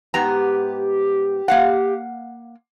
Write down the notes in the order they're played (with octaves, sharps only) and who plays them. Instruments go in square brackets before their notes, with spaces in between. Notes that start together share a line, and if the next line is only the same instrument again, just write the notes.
[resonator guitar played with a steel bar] G#2 B3 A#5 [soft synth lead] G4
[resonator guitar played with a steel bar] A#3 F5 F#5